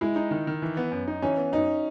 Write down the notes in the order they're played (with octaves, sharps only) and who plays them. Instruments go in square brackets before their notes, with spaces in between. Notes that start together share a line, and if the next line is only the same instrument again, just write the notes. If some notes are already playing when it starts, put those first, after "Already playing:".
[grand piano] G#3 [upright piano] E4
[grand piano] D#4
D#3
D#3
E3
B3
F#2
D#4
[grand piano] E3 [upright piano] C#4
[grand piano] B3
[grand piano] F#2 [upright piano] D#4